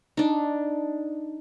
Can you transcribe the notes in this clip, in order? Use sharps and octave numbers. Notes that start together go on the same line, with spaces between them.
D4 D#4